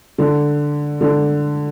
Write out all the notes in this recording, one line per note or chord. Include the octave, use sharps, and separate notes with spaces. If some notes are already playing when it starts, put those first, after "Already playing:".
D3
D3